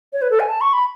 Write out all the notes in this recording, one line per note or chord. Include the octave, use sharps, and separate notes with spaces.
C#5
B4
A4
G#5
A5
C#6
B5